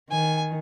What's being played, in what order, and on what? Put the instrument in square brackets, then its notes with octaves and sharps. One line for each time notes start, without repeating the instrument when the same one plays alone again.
[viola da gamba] D#3 [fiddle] G#5